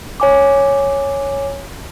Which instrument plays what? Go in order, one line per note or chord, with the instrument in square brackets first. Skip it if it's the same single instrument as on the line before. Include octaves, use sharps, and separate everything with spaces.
[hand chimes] C#5 G#5 D6